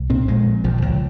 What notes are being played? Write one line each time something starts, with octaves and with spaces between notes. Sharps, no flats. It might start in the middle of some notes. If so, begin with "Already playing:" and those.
Already playing: C2
A#2 C4
A#1 G#3
A#2
A#1 F3
C#2